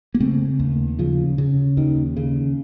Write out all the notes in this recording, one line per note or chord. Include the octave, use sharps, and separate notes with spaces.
A#3
C#3 A3 C4
D#2
C#3 F3
C#3
D#2 D#3
C#3